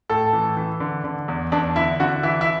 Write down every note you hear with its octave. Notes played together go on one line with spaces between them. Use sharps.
A2 A4
E3
E3
D3
D3
E2
E2 D4
D3 E4
D3 F#4
E3 E4
E4